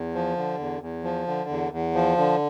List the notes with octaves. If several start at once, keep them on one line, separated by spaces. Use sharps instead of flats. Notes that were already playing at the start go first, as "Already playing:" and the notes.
Already playing: E2
F3
D3
E2
E2
F3
D3
E2
E2
F3
D3